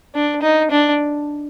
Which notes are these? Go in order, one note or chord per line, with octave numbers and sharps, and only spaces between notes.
D4
D#4
D4